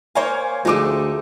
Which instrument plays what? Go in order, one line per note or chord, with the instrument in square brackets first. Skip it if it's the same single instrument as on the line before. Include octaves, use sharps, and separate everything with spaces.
[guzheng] A#3 C5 F5 [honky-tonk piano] C#5 G#5
[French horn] D2 [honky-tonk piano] F3 D6 [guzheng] G#3 A3 D#4